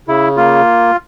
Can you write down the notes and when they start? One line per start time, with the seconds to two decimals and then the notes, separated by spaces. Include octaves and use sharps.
0.08 C#3 E4
0.37 A#3 F4